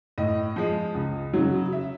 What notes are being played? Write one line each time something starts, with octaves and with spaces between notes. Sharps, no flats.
A2 D#5
F3 G#3
C#2
C#3 F#3
E5